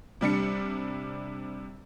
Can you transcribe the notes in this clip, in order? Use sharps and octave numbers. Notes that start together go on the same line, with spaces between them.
C3 G3 D4 C#7